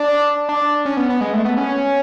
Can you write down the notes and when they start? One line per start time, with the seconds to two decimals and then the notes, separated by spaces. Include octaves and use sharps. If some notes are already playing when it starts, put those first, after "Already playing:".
Already playing: D4
0.49 D4
0.85 C#4
0.97 B3
1.10 B3
1.21 G#3
1.33 A3
1.45 B3
1.58 C#4